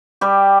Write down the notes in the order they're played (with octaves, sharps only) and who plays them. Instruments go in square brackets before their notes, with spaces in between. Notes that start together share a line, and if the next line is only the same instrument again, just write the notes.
[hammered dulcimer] G3 G4